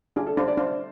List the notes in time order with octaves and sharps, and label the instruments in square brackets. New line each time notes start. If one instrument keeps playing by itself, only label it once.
[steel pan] D4 [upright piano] G#4
[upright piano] A4
[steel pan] D4 [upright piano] C5
[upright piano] D5
[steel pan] D4 [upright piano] C5